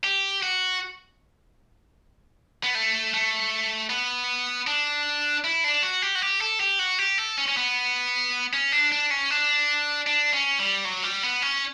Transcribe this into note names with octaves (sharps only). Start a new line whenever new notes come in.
G4
F#4
B3
A3
A3
B3
D4
E4
D4
F#4
G4
F#4
G4
A4
G4
F#4
G4
A4
C#4
C#4
B3
C#4
D4
D4
C#4
D4
D4
C#4
G3
F#3
G3
B3
C#4